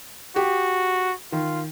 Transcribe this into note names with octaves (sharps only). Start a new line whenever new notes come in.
F#4 G4
D#3 F4